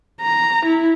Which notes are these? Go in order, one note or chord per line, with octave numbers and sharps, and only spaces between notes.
A#5
E4